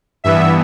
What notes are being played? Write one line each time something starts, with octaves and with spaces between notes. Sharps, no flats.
G2 E3 B3 E5